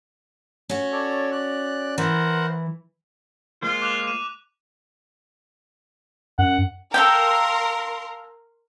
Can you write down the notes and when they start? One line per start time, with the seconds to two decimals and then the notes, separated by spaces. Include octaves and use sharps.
0.69 C#4 F#4
0.92 A4 C#5 D5
1.32 D5 F#6
1.98 E3 A#4 C5 F#5
3.62 G#3 A#3 F4 C5
3.82 D6 F#6 F7
4.03 D6 D#7
6.38 F#2 F#5
6.94 A4 A#4 F5 G5 C6